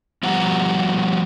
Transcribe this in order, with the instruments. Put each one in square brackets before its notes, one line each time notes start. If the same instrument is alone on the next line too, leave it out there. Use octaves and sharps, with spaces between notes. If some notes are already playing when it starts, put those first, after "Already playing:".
[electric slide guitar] F3 G3 B3 F#5 A#5